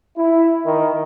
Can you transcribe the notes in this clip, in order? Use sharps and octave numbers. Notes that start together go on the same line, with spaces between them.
E4
D#3